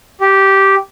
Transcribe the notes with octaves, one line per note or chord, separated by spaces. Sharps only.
G4